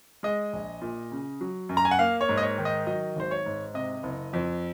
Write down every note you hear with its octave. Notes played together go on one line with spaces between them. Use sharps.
G#3 D#5
A#1
A#2
C#3
F#3
F#2
A#5
G#5
F#5
A#3 F5
C#5
G#2
D#5
C#5
D#3
D#5
F#3 D#5
G#1 C5
C#5
G#2
C3 D#5
F#1
F2